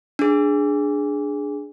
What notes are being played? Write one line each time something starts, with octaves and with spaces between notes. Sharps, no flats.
D4 G#4